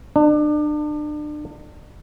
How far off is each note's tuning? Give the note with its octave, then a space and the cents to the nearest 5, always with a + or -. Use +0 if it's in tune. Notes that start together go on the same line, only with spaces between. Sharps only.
D4 +35